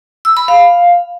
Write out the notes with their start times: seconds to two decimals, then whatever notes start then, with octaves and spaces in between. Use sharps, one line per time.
0.25 E6
0.37 B5
0.48 F5